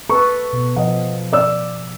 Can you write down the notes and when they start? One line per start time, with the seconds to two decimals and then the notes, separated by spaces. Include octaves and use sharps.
0.10 A4 B4 C#6
0.53 B2
0.76 F3 D#5 F#5
1.33 D5 E6